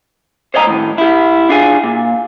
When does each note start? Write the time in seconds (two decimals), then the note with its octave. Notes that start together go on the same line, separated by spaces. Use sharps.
0.54 C5 C#5 D#5 F5 A#5
0.67 A2 D#3
0.98 E4 G4
1.49 D4 F4 G#4
1.84 A#2